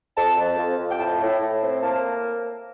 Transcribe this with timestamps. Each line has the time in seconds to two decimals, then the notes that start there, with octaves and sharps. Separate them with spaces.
0.16 F2 A5
0.38 F2
0.58 F2
0.79 F2
0.90 G5
0.99 A2 A5
1.21 A2
1.41 A2
1.62 C4
1.82 A#3 A5